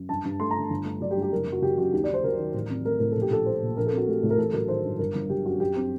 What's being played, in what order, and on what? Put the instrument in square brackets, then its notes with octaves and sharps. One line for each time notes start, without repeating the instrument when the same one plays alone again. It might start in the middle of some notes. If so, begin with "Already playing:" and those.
Already playing: [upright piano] F#2
G2 A5
G2
A3 C6
D3 A#5
G1
A3
F#3 D5
G4
G2
G4
F#1 A#4
F#1
F#4
F#3 G4
F#2 F#4
D#2 G4
D5
D#2
C5
F#3 A#4
D#3
A1
C4
A3 A#4
A2 A#4
A#1 A4
G4
A#1 A4
A3 C5
A#2
A#1 A#4
A4
C4 F#4
A3 G4
A2
A#4
A1 A4
F#3 A#4
D#3 C5
G2
G1 A#4
G1
F#3 G4
F#2 F#4
F#2 G4
C4